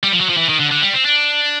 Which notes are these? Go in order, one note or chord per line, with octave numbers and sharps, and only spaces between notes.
G3
F3
F#3
F3
E3
D#3
D3
D3
G3
C4
D4